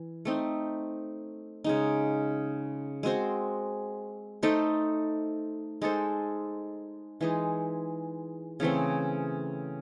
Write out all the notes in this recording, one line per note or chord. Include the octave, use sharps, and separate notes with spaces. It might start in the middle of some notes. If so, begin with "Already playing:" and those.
Already playing: E3
A3 C4 D#4
C#3 G#3 D#4
G#3 C4 F#4 C5
A3 D#4 A4 C5
G#3 D#4 A4 C5
E3 G#3 D#4
C#3 E3 A3 C4